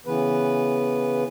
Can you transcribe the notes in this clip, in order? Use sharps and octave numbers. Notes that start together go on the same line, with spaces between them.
C#3 E3 B3 B4